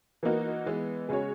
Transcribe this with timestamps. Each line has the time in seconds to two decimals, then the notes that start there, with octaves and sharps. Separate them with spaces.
0.23 E3 A#3 D#4 F#4 A#4
0.66 E3 G#3 B3
1.09 C#3 G#3 C#4 F#4 G#4 C#5